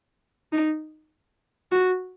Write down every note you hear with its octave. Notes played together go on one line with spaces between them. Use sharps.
D#4
F#4